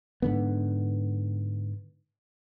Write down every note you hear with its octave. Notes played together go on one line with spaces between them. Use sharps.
G#2 D3 B3